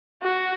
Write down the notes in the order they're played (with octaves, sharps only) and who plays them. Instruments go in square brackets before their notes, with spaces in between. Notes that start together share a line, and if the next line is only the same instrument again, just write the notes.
[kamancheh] F#4